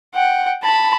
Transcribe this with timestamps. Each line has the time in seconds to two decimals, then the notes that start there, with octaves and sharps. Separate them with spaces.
0.14 F#5 G5
0.63 A5 B5